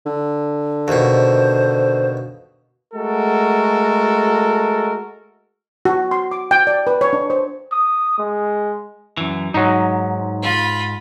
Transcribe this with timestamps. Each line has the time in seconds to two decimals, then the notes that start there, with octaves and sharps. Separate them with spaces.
0.06 D3
0.88 D#2 B2 C5
2.94 G#3 A3 F#4 A4 A#4
5.85 F#4
6.11 C6
6.32 D6
6.51 G5
6.67 D5
6.87 B4
7.01 C#5
7.13 D4
7.30 C5
7.72 D#6
8.18 G#3
9.17 F#2 E3
9.54 G#2 F#3 D#4
10.42 F4 B5